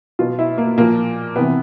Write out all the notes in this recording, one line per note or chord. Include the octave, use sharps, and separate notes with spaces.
B2 F#3 F4
E4
A#3
A#2 F3 A#3
C3 E3 B3